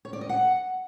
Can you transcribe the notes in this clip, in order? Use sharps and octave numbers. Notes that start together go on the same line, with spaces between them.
C#5
D5
D#5
F#5